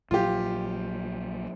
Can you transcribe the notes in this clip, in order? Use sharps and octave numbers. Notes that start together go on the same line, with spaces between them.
A#1 A#2 F#3 F4 G4